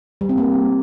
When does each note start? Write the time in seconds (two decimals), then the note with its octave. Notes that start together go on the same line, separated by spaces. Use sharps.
0.21 G3
0.29 C4
0.38 A#3